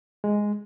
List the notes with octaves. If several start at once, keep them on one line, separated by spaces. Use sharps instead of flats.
G#3